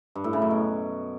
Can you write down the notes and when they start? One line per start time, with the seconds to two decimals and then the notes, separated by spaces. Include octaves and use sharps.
0.15 G2
0.24 A2
0.33 C#3
0.42 F#2
0.51 B2